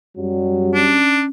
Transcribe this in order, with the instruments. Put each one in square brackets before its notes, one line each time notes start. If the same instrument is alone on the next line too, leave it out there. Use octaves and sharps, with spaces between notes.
[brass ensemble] F#2 F#3 G3
[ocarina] C#4 [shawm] D4